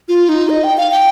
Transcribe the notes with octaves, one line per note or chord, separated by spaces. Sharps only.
F4
D#4
D#5
G5
F5
G5